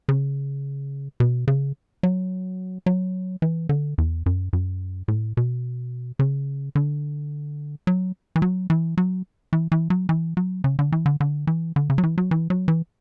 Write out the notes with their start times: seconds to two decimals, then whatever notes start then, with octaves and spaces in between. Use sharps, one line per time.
0.09 C#3
1.20 B2
1.47 C#3
2.03 F#3
2.86 F#3
3.42 E3
3.69 D3
3.98 E2
4.26 F#2
4.53 F#2
5.08 A2
5.37 B2
6.19 C#3
6.75 D3
7.87 F#3
8.36 E3
8.42 F#3
8.70 E3
8.97 F#3
9.53 E3
9.72 E3
9.90 F#3
10.09 E3
10.37 F#3
10.64 C#3
10.79 D3
10.92 E3
11.06 D3
11.20 D3
11.47 E3
11.76 D3
11.90 C#3
11.98 F#3
12.03 E3
12.18 F#3
12.31 E3
12.50 F#3
12.68 E3